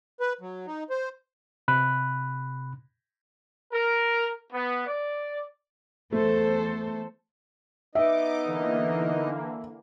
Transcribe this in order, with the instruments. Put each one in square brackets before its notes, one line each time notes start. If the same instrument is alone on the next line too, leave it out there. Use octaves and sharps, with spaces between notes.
[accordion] B4
F#3
D#4
C5
[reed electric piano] C3 B5 F#6
[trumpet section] A#4
B3
D5
[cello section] E2 A4 C5 [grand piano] A3
[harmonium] B3 D#4 D#5 [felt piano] E5 [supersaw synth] D6
[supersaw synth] D3 E3 A#3